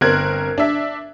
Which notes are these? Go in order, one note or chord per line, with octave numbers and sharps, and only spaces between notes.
G1 C4 A#4 F#6 G#6
D4 E5